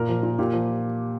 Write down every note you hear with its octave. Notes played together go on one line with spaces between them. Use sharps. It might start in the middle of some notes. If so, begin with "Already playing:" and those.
Already playing: A#2 A#4
F3
A#2
A#2 G4
F3